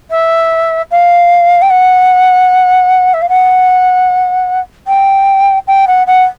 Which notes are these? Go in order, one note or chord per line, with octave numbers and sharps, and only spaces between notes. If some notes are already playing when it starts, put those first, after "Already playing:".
E5
F5
G5
F#5
E5
F5
F#5
G5
G5
F#5
F#5